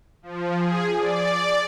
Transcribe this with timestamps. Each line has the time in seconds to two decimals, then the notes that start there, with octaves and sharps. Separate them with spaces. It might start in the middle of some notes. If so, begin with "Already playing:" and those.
0.22 F3
0.58 G#4
0.98 D5